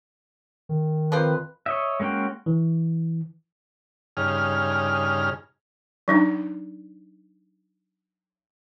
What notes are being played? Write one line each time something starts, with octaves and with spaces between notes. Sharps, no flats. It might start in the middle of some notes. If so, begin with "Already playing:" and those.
D#3
F2 F3 A#3 B4 C5
C#5 D#5 E5
G#3 A#3 C#4 F#4 G5
E3
G2 C#3 D#4 G#4 F6
F#3 D4 D#4